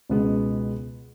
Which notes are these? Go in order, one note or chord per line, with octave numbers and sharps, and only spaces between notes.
C#2 B2 G#3 B3